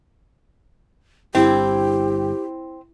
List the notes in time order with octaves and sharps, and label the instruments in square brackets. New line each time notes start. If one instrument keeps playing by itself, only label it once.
[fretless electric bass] G1 G2 [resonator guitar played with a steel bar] C4 [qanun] E4 [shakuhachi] G4